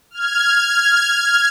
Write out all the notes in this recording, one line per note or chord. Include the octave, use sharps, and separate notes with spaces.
F6 G#6